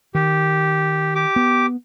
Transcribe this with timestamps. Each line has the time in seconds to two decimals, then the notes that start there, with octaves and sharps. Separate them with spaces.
0.15 D#3 G4
1.15 G4 D6
1.36 B3